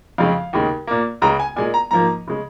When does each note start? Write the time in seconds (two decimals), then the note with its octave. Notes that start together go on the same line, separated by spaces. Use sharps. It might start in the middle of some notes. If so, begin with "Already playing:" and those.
0.18 F2 C#3 G#3 F5
0.53 D#2 C#3 G#3
0.87 A#2 A#3
1.22 C#2 C#3 G#3 A#5
1.40 G#5
1.56 A#2 G#3 G#5
1.74 A#5
1.91 G#2 F3 A#3 A#5
2.27 C#3 G#3